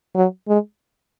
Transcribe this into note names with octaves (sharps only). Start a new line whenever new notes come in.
F#3
G#3